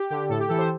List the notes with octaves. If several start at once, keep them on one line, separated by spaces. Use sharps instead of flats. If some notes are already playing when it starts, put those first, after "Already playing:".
Already playing: G4
D3 G4
A2 A4
G4
E3 A4
C5